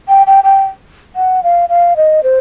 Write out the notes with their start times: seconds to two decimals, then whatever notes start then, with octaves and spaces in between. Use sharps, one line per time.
0.08 G5
0.27 G5
0.44 G5
1.16 F#5
1.43 F5
1.69 F5
1.96 D#5
2.23 C5